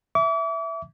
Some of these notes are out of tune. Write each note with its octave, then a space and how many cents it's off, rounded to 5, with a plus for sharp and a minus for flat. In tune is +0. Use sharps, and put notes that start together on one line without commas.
E5 +0 D6 -40